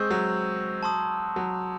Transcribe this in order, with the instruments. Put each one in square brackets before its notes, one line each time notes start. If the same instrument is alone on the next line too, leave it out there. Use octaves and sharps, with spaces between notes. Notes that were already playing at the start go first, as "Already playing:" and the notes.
Already playing: [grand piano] G#3 C4 [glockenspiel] C#6 E6 G6
[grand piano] F#3
[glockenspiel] A5 C6 D#6
[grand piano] F#3